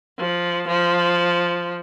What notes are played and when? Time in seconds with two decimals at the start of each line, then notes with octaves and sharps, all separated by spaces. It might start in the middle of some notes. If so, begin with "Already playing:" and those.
0.19 F3
0.68 F3